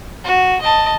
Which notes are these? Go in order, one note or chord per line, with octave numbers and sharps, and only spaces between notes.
F#4
D#5 A5